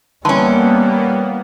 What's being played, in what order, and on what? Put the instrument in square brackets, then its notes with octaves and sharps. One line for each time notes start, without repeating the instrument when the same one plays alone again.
[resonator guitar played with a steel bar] E3 C#4 [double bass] G3 [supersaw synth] A#3 B3 [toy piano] A5 C6